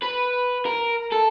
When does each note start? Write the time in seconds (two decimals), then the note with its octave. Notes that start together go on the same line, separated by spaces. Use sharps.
0.03 B4
0.66 A#4
1.12 A4